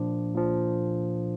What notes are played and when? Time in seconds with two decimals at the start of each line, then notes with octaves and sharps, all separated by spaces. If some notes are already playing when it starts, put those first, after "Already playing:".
Already playing: A#2 F3 D4
0.34 A#2 F3